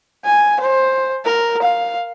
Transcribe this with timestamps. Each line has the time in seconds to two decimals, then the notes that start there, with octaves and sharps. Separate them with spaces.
0.24 G#5
0.60 C5
1.25 A#4
1.62 F5